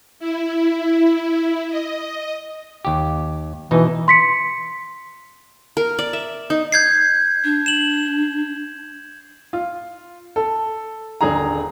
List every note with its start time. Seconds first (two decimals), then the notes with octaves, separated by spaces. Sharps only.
0.19 E4
1.70 D#5
2.85 D#2 G4
3.71 B2 E3 D#4
4.08 C6 B6 C#7
5.77 A#4
5.99 D5
6.13 E5
6.50 D#4
6.72 G6 G#6 C7
7.44 D4
7.66 E7 F#7
9.53 F4
10.36 A4
11.21 D#1 D3 G#4 A#5